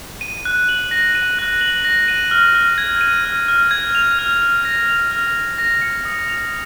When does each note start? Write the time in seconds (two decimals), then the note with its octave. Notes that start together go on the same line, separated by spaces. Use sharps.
0.21 D#7
0.45 F#6
0.69 F#7
0.91 A#6
1.15 D#7
1.39 F#6
1.61 F#7
1.84 A#6
2.08 D#7
2.31 F6
2.55 F6
2.78 G#6
3.01 D#7
3.25 F6
3.48 F6
3.71 G#6
3.95 F7
4.19 F6
4.42 F6
4.65 A#6
4.88 F7
5.11 F6
5.35 F6
5.58 A#6
5.82 C#7
6.05 D#6
6.28 F7